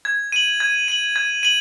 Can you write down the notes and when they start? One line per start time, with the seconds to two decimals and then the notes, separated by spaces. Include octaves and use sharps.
0.05 G#6
0.32 D#7 F#7
0.60 G#6
0.88 D#7 F#7
1.16 G#6
1.43 D#7 F#7